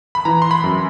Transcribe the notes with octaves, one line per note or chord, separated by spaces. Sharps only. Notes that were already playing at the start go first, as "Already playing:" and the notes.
B5
E3 A#5
C6
B5
F#2